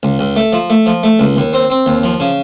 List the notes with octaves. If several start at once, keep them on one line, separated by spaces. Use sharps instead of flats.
C#2
C#2
A3
F3
A3
F3
A3
C#2
D#2
C4
C4
D#2
F3
C#3